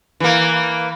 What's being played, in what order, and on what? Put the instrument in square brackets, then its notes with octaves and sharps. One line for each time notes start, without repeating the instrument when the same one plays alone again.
[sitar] E3 A#3